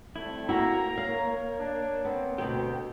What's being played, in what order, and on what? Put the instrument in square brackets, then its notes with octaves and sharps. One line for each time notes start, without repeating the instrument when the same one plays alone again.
[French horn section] G3 A3 C4 [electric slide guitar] E4
[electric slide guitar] A#3 [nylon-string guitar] E4 F#4 G4 [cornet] A#5
[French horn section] A#4 C#5 [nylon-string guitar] F5
[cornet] D4
[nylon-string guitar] B3 [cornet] C4
[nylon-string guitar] D2 B2 [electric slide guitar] G4